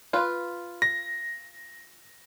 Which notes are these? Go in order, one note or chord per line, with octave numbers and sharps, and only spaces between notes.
F4 B4
A#6